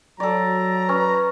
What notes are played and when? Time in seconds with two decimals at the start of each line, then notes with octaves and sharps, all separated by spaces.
0.20 F#3 A4 D5 A#5
0.89 C#4 B4